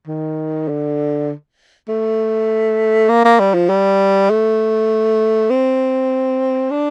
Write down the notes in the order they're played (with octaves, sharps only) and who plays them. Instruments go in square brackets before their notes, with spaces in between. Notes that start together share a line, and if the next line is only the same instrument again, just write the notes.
[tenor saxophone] D#3
D3
A3
A#3
A#3
G3
F3
G3
A3
C4
D4